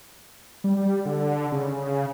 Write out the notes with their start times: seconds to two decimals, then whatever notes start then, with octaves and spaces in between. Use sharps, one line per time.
0.64 G3
1.06 D3
1.52 C#3